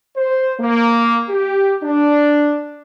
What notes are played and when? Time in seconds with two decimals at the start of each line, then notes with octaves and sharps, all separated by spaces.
0.17 C5
0.60 A#3
1.30 G4
1.83 D4